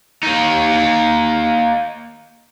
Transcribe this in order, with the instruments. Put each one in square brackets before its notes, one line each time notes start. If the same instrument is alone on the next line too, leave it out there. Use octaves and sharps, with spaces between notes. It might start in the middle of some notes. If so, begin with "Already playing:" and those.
[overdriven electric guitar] A#3 D#4